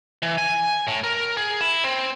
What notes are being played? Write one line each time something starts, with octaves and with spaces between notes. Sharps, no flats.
E3
G#5
A2
A#4
G#4
E4
C4